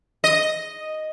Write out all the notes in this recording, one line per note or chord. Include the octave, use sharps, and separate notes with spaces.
D#5